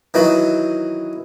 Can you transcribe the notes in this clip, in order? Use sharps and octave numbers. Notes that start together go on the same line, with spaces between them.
D#3 E3 F#3 D#4 F#4